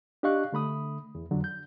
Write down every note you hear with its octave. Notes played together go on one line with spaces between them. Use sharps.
D4 G4 D#5 F5 C#6 F#6
D3 A3 B5 D#6
E2
F2 D3 F#3
G6